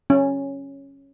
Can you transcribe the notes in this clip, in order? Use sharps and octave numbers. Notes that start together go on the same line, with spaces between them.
C#4